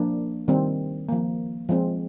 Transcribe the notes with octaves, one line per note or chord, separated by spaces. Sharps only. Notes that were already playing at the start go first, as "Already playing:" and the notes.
Already playing: F3 A#3 D4
D#3 G3 C4
F3 A#3
F3 G#3 C4